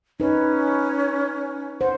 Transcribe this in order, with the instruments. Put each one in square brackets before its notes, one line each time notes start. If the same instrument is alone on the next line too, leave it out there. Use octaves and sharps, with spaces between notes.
[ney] C#4 [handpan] D#4 B4
[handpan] C5 [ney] F#5